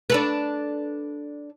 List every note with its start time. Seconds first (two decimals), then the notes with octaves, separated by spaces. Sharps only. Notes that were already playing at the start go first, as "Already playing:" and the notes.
0.10 D4 A4 B4